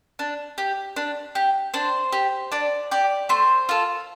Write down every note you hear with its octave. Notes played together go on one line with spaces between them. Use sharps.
D4
G4
D4
G4
D4 C5
G4
D4 D5
G4 D5
A3 C5
F4 A4